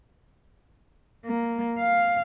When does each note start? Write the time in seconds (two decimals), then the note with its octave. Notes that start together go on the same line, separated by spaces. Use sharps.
1.26 A#3
1.79 F5